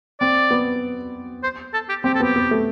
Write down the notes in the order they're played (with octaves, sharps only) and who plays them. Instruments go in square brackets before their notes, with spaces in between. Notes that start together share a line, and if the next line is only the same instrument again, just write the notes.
[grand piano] C4 [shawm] D5
[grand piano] B3
[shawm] C5
A4
G4
[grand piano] C4 [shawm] G4
[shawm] A4
[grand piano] B3
[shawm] G4
[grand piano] B3
A3